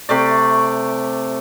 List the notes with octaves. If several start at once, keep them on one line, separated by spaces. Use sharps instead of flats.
C3 A3 D5